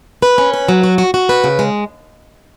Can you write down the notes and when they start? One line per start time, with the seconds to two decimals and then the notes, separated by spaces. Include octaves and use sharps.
0.22 B4
0.38 C#4
0.54 B4
0.69 F#3
0.83 F#4
0.98 F#4
1.14 F#4
1.29 B4
1.44 C#3
1.59 G#3